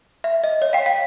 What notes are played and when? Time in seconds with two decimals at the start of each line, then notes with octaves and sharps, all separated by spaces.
0.24 E5
0.44 D#5
0.62 C#5
0.73 F5 G5
0.86 F5